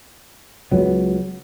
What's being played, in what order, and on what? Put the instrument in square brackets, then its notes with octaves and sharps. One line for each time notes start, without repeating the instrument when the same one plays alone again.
[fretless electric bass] C#2 F#3 B3